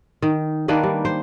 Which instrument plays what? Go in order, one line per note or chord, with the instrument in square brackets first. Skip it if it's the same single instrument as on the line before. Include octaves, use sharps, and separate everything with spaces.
[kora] D#3
D#3 A#3 D4 B4
G3
C5